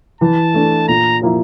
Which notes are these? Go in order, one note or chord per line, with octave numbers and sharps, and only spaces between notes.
E3 A5
A3 D4
A#2 A#5
F3 A#3 E4